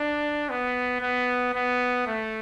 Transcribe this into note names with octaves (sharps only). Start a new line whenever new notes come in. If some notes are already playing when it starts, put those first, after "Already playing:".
Already playing: D4
B3
B3
B3
A3